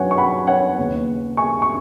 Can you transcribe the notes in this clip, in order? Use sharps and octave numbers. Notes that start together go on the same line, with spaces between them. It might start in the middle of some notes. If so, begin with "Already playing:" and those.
Already playing: F#2 F#3 B4 C#5 F#5 G#5
C#6
F#5 B5
C#5 F#5
D#2 C#3 B3
G#5 C#6
C#6